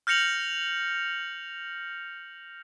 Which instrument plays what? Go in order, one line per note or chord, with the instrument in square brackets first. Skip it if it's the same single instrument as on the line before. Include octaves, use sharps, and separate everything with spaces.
[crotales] F6 G6 A#6 C#7 F7 F#7